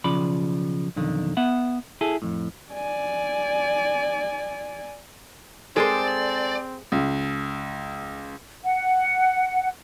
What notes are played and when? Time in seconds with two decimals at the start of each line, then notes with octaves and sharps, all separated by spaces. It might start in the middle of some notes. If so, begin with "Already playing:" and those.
0.04 B1 C#3 F3 D5 B5
0.96 B1 F2 D3 D#3
1.37 B3 E5 F#5
2.01 E4 G#4 A4
2.22 F2 A2
2.73 D5 G#5
5.76 G#3 C4 G#4 A4 C5 D5
6.92 C#2
8.64 F#5